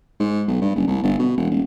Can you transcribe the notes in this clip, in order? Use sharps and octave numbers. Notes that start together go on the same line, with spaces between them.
G#2
B1
G2
F#1
C2
G1
B2
E1
D#1